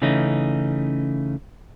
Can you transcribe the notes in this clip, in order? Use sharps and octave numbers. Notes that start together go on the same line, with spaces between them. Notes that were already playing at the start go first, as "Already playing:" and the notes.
C#3 E3 A3 C#4 D#4